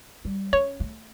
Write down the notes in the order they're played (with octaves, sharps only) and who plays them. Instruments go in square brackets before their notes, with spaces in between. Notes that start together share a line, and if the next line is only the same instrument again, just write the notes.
[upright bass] G3
[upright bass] C#4 [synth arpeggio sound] C#5
[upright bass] A3